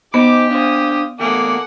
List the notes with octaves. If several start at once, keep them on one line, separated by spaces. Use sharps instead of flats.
B3 D#4 G4 G#4 C5 D6
D4 C5 F5 D#6
E2 A3 A#3 G#4 A4 D5 F#5